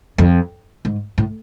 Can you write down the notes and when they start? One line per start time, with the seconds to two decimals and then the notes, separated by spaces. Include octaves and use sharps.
0.18 F2
0.85 G#2
1.18 A2